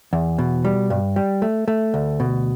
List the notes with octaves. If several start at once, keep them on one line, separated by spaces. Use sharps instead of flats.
E2
B2
G3
G2
G3
A3
A3
D2
B2